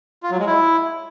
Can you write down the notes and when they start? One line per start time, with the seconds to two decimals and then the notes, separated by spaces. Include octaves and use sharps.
0.23 F4
0.31 F#3
0.39 G#3
0.47 E4